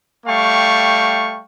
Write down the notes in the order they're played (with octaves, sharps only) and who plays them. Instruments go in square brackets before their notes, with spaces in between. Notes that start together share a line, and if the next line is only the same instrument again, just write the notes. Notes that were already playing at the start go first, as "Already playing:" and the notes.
[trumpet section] G3 A3 F5 G5 C#6